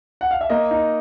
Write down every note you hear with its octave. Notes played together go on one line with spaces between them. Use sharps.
F#5
F5
E5
A#3 D#5
D#4